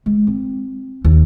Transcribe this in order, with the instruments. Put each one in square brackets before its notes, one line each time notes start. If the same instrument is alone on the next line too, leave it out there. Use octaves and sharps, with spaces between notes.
[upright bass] G#3
C4
D#2